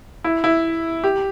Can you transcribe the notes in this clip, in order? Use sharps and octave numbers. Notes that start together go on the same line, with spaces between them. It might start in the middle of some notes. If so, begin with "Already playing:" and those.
E4
E4
G4